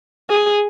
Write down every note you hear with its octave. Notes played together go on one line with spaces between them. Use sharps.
G#4